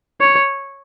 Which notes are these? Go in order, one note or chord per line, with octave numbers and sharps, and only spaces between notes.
C#5